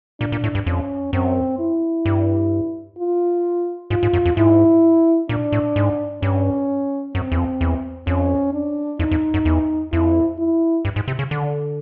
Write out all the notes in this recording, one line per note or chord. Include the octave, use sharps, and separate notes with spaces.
A#2 D4
A#2
A2
G2
F2 C#4
F#2 C4
E4
G2
F4
G#2 F4
G#2
F#2
F2
G#2 E4
A#2 D4
A2
G#2
G2 C#4
F#2 C4
E2
F2
E2
F2 C#4
D4
F2 D#4
F2
F#2
E2
F2 E4
E4
G2
G#2
C3
C#3
D3